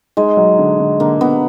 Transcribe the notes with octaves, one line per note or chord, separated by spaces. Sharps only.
G#3 D#4
F#3
D3
D3
D3 A#3
D3 B3